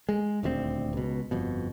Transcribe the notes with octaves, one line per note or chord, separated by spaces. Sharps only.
G#3
D#1 D2 G3 C4
C#2 B2
G1 F2 B2